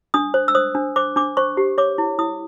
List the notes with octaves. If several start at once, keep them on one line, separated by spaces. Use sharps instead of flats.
D4 D#6
C5
E6
C5 D#6
D4
C5 D6
D4 D6
C5 C#6
G4
C#5 D6
E4
E4 D#6